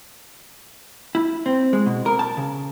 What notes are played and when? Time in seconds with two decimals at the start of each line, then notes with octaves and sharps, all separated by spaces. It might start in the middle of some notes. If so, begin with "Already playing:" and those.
1.15 E4
1.46 C4
1.73 G#3
1.86 B2
2.06 A#4
2.19 A5
2.37 C#3